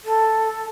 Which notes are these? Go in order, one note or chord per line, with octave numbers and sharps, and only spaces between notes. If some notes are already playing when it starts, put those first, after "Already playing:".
A4